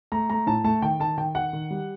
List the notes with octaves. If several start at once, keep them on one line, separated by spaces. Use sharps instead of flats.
A3 A#5
A3 A#5
A2 A5
A3 A5
D#3 G5
D#3 A5
D#3 G5
D#3 F#5
D#3
G3